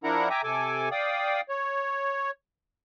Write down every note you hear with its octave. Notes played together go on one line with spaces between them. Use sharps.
F3 D4 E4 A#4 F#5 A#5
E5 G5 G#5 A#5 D6
C3 A4 G#5 D6
D5 F5 G5 D#6
C#5